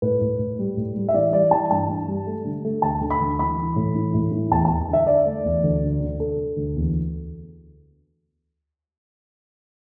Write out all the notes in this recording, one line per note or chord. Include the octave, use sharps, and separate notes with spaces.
A2 B4
A2
A2
G3
A2
G3
E5
E3 D5
G3 D5
E3 A5
G2 A5
G2
G3
A3
D3
A3
D2 A5
D3
B5
D2
E3 B5
E3
A2
E3
A2
E3
E2 A5
E2 A5
D3 E5
D3 D5
A3
E2
D2
D3
D3
D3 A4
D3
D2
E2